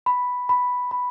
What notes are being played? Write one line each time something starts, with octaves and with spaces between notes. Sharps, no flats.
B5
B5
B5